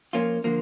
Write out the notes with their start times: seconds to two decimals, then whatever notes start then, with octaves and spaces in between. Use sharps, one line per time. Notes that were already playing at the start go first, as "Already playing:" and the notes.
0.13 F3 A#3 C#4 F4
0.44 D3 F3 A#3